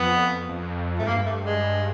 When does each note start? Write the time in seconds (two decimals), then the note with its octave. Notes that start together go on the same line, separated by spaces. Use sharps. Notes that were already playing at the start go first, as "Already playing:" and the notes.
Already playing: F2 B3
0.49 F2
0.99 G#2 A3
1.07 G2 A#3
1.26 A3
1.45 G#3